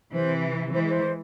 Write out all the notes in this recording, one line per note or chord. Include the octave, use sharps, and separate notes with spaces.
C3 E3 C5
E3 G#3 C5
C5